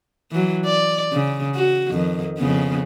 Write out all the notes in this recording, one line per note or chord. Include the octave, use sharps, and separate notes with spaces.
E3 F#3
D5
C#3
F#4
F2 D#3
F2 C#3 B3